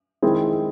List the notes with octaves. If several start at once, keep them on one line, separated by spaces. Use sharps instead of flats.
D#3 G#3 C4 E4 G#4